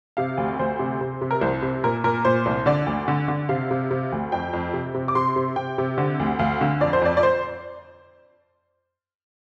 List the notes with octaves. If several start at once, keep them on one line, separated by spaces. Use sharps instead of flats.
C3 F5
D2
D2 C5
C3
C3
C3
A#4
C2 C5
C3
A#2 A#4
A#2 A#4
A#2 C5
C2
D3 D5
D2
D3
D3
C3 F5
C3
C3
D2
F2 G5
F2
C3
C3
D6
C3 C6
C3
C3 G5
C3
D3
D2
D2 F5
D3
F2 D5
C5
F2 D5
D5
C5